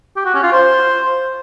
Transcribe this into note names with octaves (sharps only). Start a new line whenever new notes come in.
G4
F#4
C#4
F4
C5